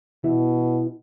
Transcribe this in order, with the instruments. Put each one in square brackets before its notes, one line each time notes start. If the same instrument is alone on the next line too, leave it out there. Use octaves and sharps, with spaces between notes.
[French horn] B2 [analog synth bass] E3